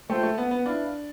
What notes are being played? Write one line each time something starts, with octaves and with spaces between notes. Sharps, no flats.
A3 F4 C5 E5 G5
A3
B3
B3
D4 E4 B4 F5